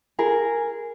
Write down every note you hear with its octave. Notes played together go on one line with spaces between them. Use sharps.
G#4 A#4